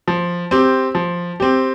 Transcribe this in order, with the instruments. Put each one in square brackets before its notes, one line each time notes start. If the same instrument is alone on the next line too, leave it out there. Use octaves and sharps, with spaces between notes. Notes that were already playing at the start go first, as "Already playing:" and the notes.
[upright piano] F3
C4 G4
F3
C4 G4